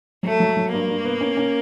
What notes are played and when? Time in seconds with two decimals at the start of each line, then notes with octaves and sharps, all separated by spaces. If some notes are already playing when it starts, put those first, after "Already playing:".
0.23 F#3 A3
0.40 F#3
0.57 F#3
0.72 G2 A#3
0.88 G2
1.05 B3
1.21 C#4
1.37 C#4